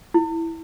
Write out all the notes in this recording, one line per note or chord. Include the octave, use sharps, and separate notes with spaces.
E4